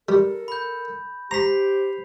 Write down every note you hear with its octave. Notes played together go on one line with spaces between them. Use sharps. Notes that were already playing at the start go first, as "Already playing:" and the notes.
G3 A4 A#4
B5 G6
G4 C5 A#5 B6 C7 F7